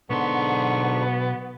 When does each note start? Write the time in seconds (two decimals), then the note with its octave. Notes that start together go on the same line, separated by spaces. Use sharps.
0.10 B1 G#2 D3 B3 C6 C#6